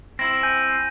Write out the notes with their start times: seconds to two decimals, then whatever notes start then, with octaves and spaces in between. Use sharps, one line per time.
0.19 C4 E4 A#6
0.43 G#5 G6 D#7